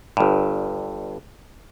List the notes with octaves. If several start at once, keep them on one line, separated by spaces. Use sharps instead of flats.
G1 G2